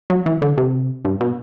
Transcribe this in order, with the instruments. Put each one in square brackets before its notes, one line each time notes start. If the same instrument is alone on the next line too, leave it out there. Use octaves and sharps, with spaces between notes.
[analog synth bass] F#3
E3
D3
C3
G2
B2